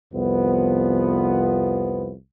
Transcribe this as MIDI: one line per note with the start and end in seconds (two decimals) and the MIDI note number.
0.13 2.13 36
0.13 2.13 41
0.13 2.13 53
0.13 2.13 59